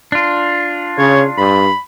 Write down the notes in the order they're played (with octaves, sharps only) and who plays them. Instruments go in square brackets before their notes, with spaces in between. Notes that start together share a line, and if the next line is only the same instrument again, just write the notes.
[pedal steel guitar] D4 F4
[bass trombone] C#3 [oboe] C#5
[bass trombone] G2 [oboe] B5